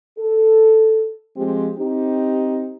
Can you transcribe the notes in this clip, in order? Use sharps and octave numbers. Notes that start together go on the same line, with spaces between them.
A4
F3 G#3 C4 G4
C4 D#4 G4